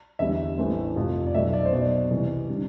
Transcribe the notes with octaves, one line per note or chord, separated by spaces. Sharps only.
E2 D3 G3 E5
A1 A2 E3 A3 C4
F1 F2 C3 F3
D5
B1 B2 A3 E5
D5
C5
B1 B2 B3 D5
C2 C3 E3
D3 G3 C4